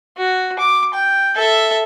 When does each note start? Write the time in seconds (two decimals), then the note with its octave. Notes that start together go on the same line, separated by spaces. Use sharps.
0.17 F#4
0.59 D6
0.94 G5
1.35 A4 E5